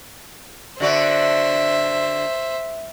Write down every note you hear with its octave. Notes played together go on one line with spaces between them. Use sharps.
D3 F#4 C5 D5 E5